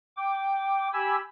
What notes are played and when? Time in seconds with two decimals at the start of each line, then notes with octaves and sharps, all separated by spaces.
0.17 G5 D6
0.93 G4 G#5 B5 E6